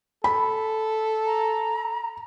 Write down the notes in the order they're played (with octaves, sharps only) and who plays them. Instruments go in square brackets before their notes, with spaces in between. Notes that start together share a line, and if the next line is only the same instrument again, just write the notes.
[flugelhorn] A4 [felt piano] B5
[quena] A#5